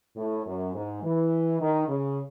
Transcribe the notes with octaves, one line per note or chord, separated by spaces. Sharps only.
A2
F#2
G#2
E3
D#3
C#3